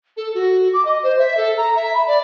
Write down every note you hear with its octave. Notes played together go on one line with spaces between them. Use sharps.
A4
F#4
D6
D#5
C5
E5
A4
A#5
E5
B5
D5